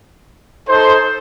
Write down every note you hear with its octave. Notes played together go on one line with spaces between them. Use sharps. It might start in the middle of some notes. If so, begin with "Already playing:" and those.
D#4 A4 C5